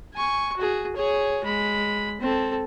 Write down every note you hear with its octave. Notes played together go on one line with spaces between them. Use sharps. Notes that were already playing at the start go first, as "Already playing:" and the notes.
G#5 C#6
F#4 G#4
G#4 C#5
G#3 B5
C4 A4